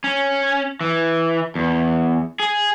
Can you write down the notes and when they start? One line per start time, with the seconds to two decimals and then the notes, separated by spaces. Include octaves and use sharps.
0.04 C#4
0.81 E3
1.55 E2
2.40 G#4